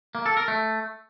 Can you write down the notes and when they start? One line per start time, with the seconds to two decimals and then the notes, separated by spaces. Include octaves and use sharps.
0.15 A#3
0.26 A4
0.37 A#4
0.48 A3